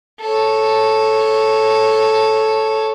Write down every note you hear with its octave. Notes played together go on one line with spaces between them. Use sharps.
A4 C#5